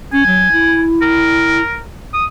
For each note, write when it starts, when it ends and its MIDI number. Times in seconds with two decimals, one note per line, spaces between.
0.13 0.23 61
0.13 0.81 80
0.27 0.51 54
0.52 1.61 64
1.02 1.82 70
2.14 2.25 87